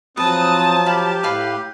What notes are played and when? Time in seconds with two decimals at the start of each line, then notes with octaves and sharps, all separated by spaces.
0.17 F3 F#3 C4 B4 A5 D#6
0.86 G4 F5 B5
1.23 A2 B4 F5 B5